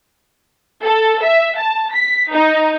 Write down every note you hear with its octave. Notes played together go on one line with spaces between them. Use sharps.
A4
E5
A5
B6
D#4